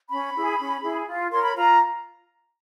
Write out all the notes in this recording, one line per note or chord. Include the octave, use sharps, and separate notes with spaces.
C#4 B5
E4 G#4
C#4
E4 G#4
F4
A#4 C#5 C6
B5
F4 A#5